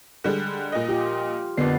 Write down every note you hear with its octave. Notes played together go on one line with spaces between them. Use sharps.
D3 G3 G#3
A#2 D#5
F4 G4
F#1 F2 D3 B3 D5 C7